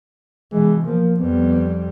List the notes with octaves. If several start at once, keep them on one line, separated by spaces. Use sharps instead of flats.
B2 E3 G#3
F3 A#3
F2 G3 B3